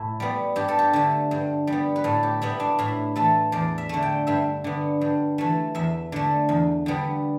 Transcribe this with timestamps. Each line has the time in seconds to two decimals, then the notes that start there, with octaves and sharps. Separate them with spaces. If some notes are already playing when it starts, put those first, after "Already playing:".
Already playing: A2 E4
0.20 G3 B3
0.56 G2 G4
0.68 A4
0.79 G4
0.93 D3 A3
1.31 G2
1.67 G3
1.72 B3
1.96 B4
2.04 A2 A4
2.23 G4
2.42 G3 B3 E4
2.60 D4
2.79 A2 E4
3.16 E3 A3 A4
3.52 E2 D5
3.78 E5
3.89 D3 A3
4.02 G5
4.27 G2 E5
4.64 D3 B3
5.01 G2
5.38 E3 A3
5.75 E2 E5
6.12 D3 A3
6.49 E2
6.86 D3 G3 B3